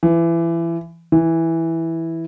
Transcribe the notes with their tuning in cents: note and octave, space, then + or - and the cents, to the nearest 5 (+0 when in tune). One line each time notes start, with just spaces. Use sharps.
E3 +25
E3 -5